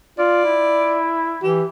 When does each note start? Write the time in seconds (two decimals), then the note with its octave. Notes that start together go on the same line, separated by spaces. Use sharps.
0.19 F4 D5
0.45 E4
1.42 E3 G4